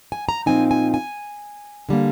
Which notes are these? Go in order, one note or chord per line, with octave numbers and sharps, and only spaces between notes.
G#5
A#5
A#2 F3 C4 D#4 G#5
G#5
G#5
D3 G3 A#3